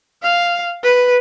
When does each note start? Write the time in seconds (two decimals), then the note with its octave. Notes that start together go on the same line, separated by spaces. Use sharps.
0.23 F5
0.83 B4